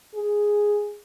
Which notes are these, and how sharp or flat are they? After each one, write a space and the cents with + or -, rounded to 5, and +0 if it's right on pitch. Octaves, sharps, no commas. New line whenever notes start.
G#4 +0